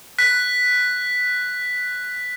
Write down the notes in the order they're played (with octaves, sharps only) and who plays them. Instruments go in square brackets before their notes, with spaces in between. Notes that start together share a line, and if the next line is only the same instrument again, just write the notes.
[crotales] F#6 B6